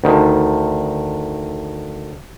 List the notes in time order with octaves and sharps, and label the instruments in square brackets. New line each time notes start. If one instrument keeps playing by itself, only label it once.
[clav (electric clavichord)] D2 D#3